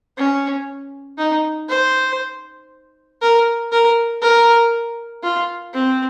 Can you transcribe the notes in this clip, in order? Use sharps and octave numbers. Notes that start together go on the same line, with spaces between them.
C#4
D#4
C5
A#4
A#4
A#4
F4
C4